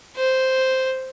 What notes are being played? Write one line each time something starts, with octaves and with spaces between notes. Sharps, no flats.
C5